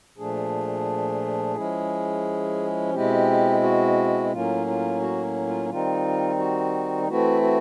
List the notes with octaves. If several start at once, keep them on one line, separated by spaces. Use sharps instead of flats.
A#2 F3 A3 D4 G#4
F3 G#3 C#4 E4
B2 G#3 C4 E4 G4
F#4
A2 F#3 A#3 C#4 F4
F4
F#4
F4
D#3 G3 C4 D#4 F4
F#4
E3 A3 C4 E4 F#4
F#4